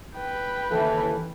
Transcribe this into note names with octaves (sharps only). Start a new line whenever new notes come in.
B4 G5
D#2 C#3 E3 A4